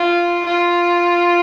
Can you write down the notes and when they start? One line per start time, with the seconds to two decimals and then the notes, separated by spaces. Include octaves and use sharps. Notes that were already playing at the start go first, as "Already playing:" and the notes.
Already playing: F4
0.45 F4